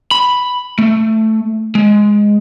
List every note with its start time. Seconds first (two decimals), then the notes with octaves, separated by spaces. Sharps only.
0.11 B5
0.79 A3
1.75 G#3